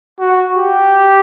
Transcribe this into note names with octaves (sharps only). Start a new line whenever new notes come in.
F#4
G4